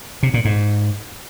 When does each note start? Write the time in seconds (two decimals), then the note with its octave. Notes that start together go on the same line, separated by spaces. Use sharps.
0.23 C3
0.34 A#2
0.45 G#2